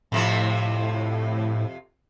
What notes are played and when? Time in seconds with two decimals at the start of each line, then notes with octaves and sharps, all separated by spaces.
0.12 F2 A2 C3 F3